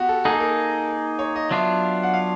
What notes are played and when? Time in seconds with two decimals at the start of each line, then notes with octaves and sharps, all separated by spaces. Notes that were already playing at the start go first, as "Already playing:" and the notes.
Already playing: B3 F#4 G4
0.09 A4
0.25 A#3 D#4 G#4 A4
0.40 A#4
1.19 C#5
1.36 D#5
1.51 F#3 B3 D4 F4 E5
2.03 F#5
2.13 F5